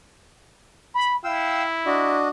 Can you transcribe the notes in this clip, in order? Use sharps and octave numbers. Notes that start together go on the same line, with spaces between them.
B5
E4 F5 G5 E6
D4 F#4 D#5